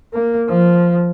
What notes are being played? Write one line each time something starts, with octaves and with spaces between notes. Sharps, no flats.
A#3
F3